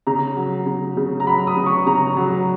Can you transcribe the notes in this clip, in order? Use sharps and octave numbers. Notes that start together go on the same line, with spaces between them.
C#3 A#5
F#3
C#3
C#3
A#5
F#3 B5
D#6
C#3
C#6
C#3 A#5
F#3